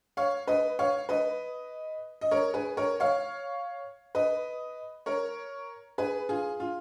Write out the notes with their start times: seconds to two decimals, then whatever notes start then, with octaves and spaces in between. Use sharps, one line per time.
0.17 C#5 F5
0.47 B4 D#5
0.79 C#5 F5
1.09 B4 D#5
2.21 D#5
2.31 A#4 C#5
2.54 G#4 B4
2.77 A#4 C#5
3.00 C#5 F5
4.15 B4 D#5
5.06 A#4 C#5
5.98 G#4 B4
6.29 F4 G#4
6.60 F4